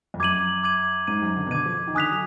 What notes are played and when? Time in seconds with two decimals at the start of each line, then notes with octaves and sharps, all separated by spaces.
0.14 F2
0.20 F#2 D6 G#6 D#7 F#7
0.63 D6 G#6 D#7 F#7
1.07 G#2 D6 G#6 D#7
1.22 F#2
1.36 D3
1.47 B2
1.51 D3 D6 G#6 D#7
1.66 F3
1.88 D#3
1.95 D3 G#5 D#6 F#6 B6 F7
2.11 F#3